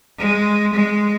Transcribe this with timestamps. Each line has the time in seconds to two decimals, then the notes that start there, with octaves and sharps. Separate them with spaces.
0.19 G#3
0.74 G#3